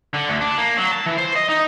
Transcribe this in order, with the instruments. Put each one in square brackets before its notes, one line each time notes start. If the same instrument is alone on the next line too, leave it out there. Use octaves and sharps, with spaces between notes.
[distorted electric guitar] D3
D2
D4
A#3
F#3
A5
E3
C5
D#5
D#4